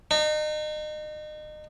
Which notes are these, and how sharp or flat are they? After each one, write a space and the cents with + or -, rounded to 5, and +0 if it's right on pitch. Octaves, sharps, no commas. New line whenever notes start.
D#4 -35